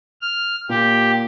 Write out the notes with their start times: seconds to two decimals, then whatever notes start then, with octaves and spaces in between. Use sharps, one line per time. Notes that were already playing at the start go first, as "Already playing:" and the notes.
0.21 F6
0.70 A#2 G4